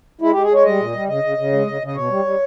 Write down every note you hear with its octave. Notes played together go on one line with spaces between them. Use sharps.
G#3 E4
G#3 G4
G#4
G#3 C#5
G3 D#5
A#2
G3
C#3 D#5
C#3
C#3
G#3
C#3
C#3
D#5
B2 C#5
G3
G3